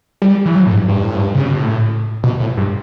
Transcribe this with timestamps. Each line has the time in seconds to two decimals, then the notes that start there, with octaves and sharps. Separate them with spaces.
0.22 G3
0.45 E3
0.55 F#3
0.67 A2
0.72 G2
0.89 G2
1.02 A2
1.16 G2
1.35 C#3
1.46 B2
1.56 A2
2.24 B2
2.40 A2
2.57 G2